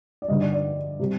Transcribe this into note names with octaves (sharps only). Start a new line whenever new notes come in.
D5
G2 D3 G3 D#5
D5
D5
C3 G3